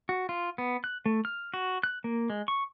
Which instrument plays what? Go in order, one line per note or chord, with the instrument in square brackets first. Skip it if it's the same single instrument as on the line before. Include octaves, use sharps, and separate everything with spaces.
[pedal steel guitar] F#4
F4
B3
F#6
A3
F6
F#4
F#6
A#3
G#3
C#6